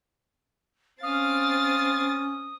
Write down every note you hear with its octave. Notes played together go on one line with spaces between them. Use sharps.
C4 C#4 F5 D#6 A6